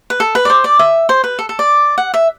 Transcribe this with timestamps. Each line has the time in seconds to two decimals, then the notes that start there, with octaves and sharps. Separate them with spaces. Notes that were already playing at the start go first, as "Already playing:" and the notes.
0.10 B4
0.20 A4
0.35 B4
0.45 D5
0.50 C5
0.64 D5
0.79 E5
1.09 C5
1.24 B4
1.39 A4
1.49 A4
1.59 D5
1.98 F#5
2.14 E5